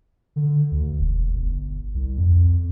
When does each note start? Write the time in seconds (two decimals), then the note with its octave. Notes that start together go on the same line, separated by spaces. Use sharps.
0.36 D3
0.72 D2
0.99 E1
1.35 G1
1.94 C2
2.17 F2